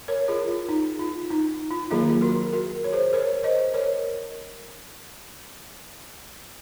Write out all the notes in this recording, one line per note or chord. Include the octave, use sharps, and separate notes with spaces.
A#4 C#5
F4 G#4
F4
D#4
F4
D#4
F4
D#3 F#3 A#3 F4 G#4
F#4 A#4
F#4 A#4
C#5
G#4 C5
A#4 C#5
C5 D#5
A#4 C#5